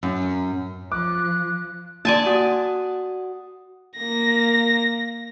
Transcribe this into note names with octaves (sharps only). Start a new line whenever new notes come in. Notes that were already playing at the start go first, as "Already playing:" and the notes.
F#2
F3 D6 F#6
A#3 D5 G#5 A5 C6
F#4 F#5 D#6
A#3 A#6